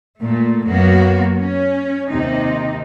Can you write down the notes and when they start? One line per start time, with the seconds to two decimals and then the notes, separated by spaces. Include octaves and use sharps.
0.20 A#2 A3
0.66 F#2 F#3 A#3 B3 F#4
1.37 C#4
2.10 D#2 C3 D#4